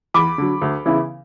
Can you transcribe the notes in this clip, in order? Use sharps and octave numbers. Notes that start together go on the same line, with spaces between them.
E2 B5 D6
D3 F#3
D2
C#3 E3 B3 E4